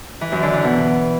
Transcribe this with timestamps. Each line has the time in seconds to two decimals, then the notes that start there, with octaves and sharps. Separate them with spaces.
0.21 E3
0.32 F#2
0.43 D3
0.53 E3
0.64 B2